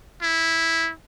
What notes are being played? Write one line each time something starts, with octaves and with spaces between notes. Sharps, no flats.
E4